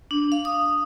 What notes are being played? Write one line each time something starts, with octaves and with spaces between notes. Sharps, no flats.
D4
F5
D#6